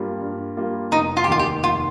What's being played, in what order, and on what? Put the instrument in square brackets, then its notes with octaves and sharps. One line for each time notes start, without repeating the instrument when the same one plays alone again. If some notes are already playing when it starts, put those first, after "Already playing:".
Already playing: [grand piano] G2 G3 A#3 F4
G2
G3 A#3 F4
[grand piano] F1 [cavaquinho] D#4
[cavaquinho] F4
G4
[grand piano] D#2 D#3 A#3 D#4 [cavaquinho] F4
[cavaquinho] G4
[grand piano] F1 [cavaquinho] F4